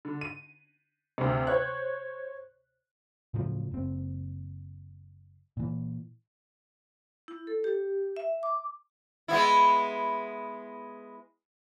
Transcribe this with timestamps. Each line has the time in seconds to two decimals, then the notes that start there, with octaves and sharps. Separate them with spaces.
0.05 D3
0.21 D#7
1.18 D2 C3
1.47 C5 C#5 F#6
3.34 A2 C#3 F3 F#3
3.71 F#1 C4
5.57 A#2 E3
7.28 E4
7.47 A4
7.64 G4
8.16 E5
8.43 D6
9.28 G#3 B3 E4